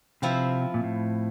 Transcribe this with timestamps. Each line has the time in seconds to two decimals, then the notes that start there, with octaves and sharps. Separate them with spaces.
0.22 C3 F3 C4 E4
0.74 A#2
0.84 A2